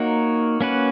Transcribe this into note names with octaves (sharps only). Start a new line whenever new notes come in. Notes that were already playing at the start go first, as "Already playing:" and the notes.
Already playing: A#3 D#4 F#4 A#4 C#5
A#3 C#4 F#4 B4